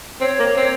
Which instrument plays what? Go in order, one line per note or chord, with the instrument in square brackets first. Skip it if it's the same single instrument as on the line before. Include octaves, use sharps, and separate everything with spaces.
[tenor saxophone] C4 [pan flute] C#5
[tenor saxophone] A#3
C4